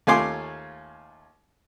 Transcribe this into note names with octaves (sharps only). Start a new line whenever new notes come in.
D#2 A3 F4 G#5 C6 D6